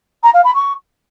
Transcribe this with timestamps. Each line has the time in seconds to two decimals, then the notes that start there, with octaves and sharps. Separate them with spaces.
0.23 A#5
0.34 F5
0.44 B5
0.55 C#6